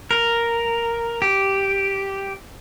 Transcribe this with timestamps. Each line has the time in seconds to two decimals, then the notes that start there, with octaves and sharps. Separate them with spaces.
0.11 A#4
1.22 G4